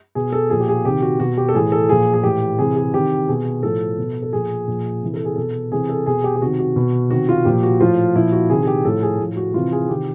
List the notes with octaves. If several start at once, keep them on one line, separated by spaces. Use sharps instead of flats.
B2 G#4
A4
A#2 F3 G#4
G4
G#4
C3 D#3 G4
F#4
B2 F#4
G4
A4
A2 E3 G#4
A4
A#2 F3 G#4
G#4
A2 E3 G4
C3 E3 G#4
G#4
C3 D#3 G4
B2 G#4
A2 F3 A4
B2
A4
A#2 F3 G#4
A#2 F3
C3 E3
A4
G#4
B2 A4
C3 E3 G#4
A4
B2 G#4
G4
G4
C3 D#3 F#4
F#4
B2
C3 D#3 F#4
F4
A#2 F3 G4
F#4
A2 F3 F4
A#2 F3 E4
F#4
C3 D#3 G#4
G#4
G4
A2 F3 A4
G#4
A2 F3
F#4
C3 E3 F4
G#4
C3 D#3 G4